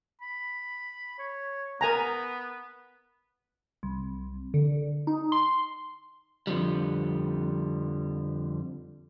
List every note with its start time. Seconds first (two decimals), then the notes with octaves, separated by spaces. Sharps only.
0.22 B5
1.19 C#5
1.81 B3 A#4 G#5 A#5
3.83 C2
4.54 D3
5.07 D#4
5.32 C6
6.47 F2 D3 F3 G3